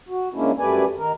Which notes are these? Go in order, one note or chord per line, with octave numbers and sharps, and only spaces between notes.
F#4
C#3 G#3 A#3 C#4 D4 E4
F#2 G3 A3 B4 D5 G#5
D#3 A#4